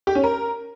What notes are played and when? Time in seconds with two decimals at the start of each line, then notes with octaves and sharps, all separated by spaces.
0.07 G4
0.15 C#4
0.24 A#4